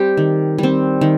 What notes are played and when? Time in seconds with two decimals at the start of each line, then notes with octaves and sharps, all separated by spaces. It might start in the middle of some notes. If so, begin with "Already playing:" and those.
Already playing: G3 C4 G4
0.17 D#3
0.58 G3 C4
1.01 D#3